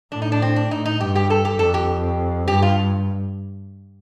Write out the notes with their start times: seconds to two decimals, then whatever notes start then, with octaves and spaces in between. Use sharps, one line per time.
0.12 A2 D4
0.22 D#4
0.32 D4
0.42 C4
0.56 D4
0.71 A2 D#4
0.86 D#4
1.00 G2 G4
1.15 G4
1.30 A4
1.45 G4
1.59 F2 A4
1.74 G4
2.48 G2 G4
2.62 F4